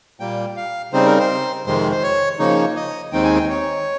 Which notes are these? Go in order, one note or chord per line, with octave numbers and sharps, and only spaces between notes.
A#2 G3 A#3 G5
F5
C#3 G3 C4 D#4 C5
A#4
C5
F2 C3 D#3 G#3 C5
C5
C#5
C#3 F3 A#3 D#4 C#5
D#5
D#2 D#3 G#3 C4 D#4 G5
G#5
G5
C#5